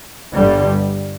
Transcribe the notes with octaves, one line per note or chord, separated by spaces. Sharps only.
G1 G2 D3 G3